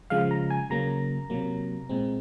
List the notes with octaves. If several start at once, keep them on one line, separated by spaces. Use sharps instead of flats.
C#3 F3 G#3 F5
A#5
G#5
C#3 F#3 A#3 A#5
C3 F#3 A#3
A#2 G#3 C4